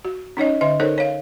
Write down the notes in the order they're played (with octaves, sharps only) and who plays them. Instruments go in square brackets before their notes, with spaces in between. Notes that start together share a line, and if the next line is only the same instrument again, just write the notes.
[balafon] F#4
C#4 D#4 C#5 D#5
D3 D#5 E5
D#4 A4 A#4 C5 C#5
C#5 F5